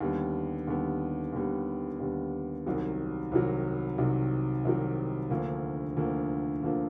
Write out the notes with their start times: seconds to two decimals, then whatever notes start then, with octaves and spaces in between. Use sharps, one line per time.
0.01 D#2 D3 G3 B3
0.67 D#2 D3 G3 B3
1.33 D#2 D3 G3 B3
2.00 D#2 D3 G3 B3
2.66 C2 C3 D#3 F#3
3.32 C2 C3 D#3 F#3
3.98 C2 C3 D#3 F#3
4.65 C2 C3 D#3 F#3
5.30 D2 D3 F3 A#3
5.97 D2 D3 F3 A#3
6.63 D2 D3 F3 A#3